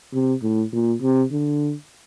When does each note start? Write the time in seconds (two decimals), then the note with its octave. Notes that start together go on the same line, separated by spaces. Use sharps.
0.13 C3
0.43 A2
0.73 A#2
1.02 C3
1.32 D3